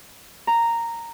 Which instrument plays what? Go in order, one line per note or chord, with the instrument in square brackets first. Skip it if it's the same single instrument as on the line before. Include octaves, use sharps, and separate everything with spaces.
[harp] A#5